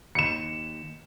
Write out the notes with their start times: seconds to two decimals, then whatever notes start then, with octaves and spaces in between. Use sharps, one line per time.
0.15 D#2 C#7 E7